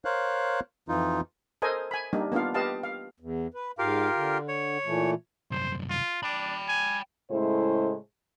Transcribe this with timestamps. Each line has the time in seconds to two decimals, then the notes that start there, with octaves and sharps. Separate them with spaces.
0.05 A#4 C5 C#5 F5 F#6
0.89 F2 E3 D#4 F4
1.62 A4 A#4 C5 D#5 G#5
1.91 G#5 B5
2.13 G3 A#3 D4 D#4
2.32 A#3 B3 D4 F4 F5
2.54 G4 B4 D#5 F5 A5
2.83 F5
3.20 E2
3.54 B4
3.79 G#2 F4 G4 A#4 F5
4.15 D3
4.48 C#5
4.85 A#2 E3 A3
5.51 C2 F#2 C5
5.89 F4
6.23 D4 G5 B5
6.68 G#5
7.31 A2 C#3 G#3 A3 E4 C5